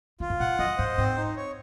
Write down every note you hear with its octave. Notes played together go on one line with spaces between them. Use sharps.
D#3 F4
G#2
A#2 F#5
F#2 D#5
G#2 C5
G#2 C4
D#4
C#5